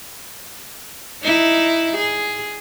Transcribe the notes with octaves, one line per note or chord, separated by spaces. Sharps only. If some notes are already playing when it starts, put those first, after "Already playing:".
D#4 E4
G#4